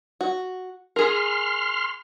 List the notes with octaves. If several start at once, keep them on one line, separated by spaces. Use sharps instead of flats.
F#4
G#4 A#4 C6 F6